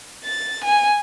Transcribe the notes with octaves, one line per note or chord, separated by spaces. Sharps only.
A6
G#5